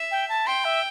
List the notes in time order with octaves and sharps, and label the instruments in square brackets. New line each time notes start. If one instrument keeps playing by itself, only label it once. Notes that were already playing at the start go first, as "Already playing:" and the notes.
Already playing: [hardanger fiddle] E5
[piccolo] G5
A5
[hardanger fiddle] G5 [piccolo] C6
[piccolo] E5